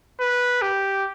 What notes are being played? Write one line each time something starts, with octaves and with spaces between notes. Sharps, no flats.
B4
G4